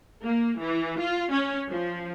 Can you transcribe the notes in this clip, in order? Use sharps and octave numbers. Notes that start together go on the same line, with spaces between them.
A#3
E3
F4
C#4
F3